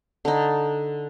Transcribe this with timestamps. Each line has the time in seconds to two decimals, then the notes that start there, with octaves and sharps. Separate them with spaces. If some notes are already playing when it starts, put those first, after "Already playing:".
0.25 D3 D#4